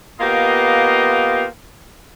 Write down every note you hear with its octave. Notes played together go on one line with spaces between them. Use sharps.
A#3 B3 F4 G4 D#5